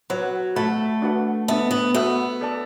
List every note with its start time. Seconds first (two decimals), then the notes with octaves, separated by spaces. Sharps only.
0.10 F#3 F#4 B4 F#5
0.56 A3 A4 F#5 B5
1.02 D4 F#4 B4 F#5
1.48 B3 D4 B4 E5 A5
1.71 B3
1.95 B3 F#4 A4 E5
2.41 A4 D5 A5